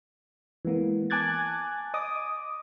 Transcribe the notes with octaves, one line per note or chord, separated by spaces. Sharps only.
E3 G#3 A#3 B3
G#5 A5 D6 F#6 G#6 A6
D#5 D6 D#6